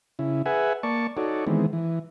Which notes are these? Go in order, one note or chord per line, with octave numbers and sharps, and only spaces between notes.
C#3 E4
G#4 B4 E5 F#5 G#5
A#3 D5 A5 C#6
D#4 F#4 A4 C#5 D5
D#3 E3 G#3 B3 C4
E3